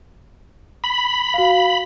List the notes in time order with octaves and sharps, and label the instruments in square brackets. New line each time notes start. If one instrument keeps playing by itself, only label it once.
[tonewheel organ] B5
[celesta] F#4 F5